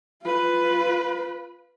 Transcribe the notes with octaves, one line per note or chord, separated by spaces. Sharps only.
F4 B4